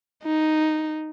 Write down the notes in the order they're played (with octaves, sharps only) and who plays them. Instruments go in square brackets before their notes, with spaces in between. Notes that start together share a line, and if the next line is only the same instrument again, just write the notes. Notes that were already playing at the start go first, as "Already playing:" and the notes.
[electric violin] D#4